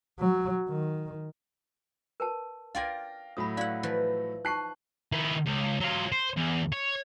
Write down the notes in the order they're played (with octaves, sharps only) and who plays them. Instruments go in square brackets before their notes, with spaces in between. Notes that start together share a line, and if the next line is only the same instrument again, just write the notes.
[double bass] F#3
D#3
[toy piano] A#4 B4 A5
[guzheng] F4 D5 G#5 [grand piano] F5 G5 A#6
[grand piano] A2 F#3 A3 [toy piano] B5 D#6
[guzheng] E4 F#5 [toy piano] D5 F5
[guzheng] E3 F3 B4
[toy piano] D#4 A5 C#6 [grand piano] F#6 C7
[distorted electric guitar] D#3 E4
C#2
F#3 F4
C5
E2
C#5